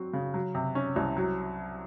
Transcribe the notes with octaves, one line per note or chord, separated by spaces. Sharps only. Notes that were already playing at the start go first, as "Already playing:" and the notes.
Already playing: F#3 C4 F#4
C#3
F#3
C3
C#4
C2
F#3